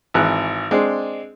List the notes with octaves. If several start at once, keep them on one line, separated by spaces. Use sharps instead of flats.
G#1 E3 F#6
G#3 C4 D4